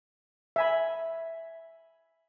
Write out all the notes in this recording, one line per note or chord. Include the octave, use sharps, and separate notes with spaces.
E5 G#5 B5